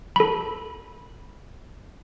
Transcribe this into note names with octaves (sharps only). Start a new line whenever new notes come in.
A4 B5